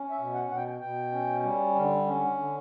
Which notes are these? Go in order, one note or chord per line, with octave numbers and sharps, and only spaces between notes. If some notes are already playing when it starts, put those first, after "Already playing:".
Already playing: C#4
E5
B2
F#5
B2 F#5
G5
B2 G5
C#4
G3
D3
C#4
D3